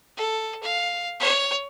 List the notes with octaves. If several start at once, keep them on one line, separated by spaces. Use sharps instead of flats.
A4
F5
C#5